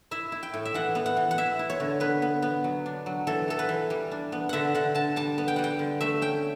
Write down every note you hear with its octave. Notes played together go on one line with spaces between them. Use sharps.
E4 E5
E4
G5
A2
E5
E3 F#5
B3
F#5
E3
F#5
E4 E5
E4
C#5
D3
B3 B4
B3
B3
F#3
D4
F#3
E3 A4
B3 A4
B4
E3
G3
D4
B3
D3 E5 F#5
D3 F#5
D3 A5
G3 A5
B3
G5
G3 F#5
G5
D3
A3 E5
C#4 G5